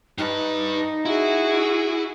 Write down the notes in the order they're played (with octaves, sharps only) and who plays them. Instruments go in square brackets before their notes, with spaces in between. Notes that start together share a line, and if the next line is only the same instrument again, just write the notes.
[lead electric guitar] G2 B4 [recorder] D#4
[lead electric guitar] E4 [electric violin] F#4 G#4